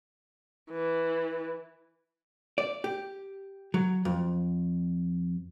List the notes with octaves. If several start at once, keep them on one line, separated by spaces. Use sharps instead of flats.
E3
D5
G4
F#3
F2